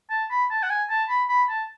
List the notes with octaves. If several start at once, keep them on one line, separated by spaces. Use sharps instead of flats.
A5
B5
A5
F#5
G#5
A5
B5
B5
A5